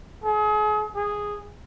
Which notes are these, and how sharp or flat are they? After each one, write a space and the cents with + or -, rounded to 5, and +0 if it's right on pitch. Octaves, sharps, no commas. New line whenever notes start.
G#4 +35
G#4 -5